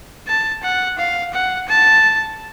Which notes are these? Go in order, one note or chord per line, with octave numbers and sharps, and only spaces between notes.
A5
F#5
F5
F#5
A5